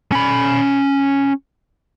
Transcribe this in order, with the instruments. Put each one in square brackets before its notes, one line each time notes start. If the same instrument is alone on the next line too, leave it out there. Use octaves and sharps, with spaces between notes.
[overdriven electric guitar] C#4 B5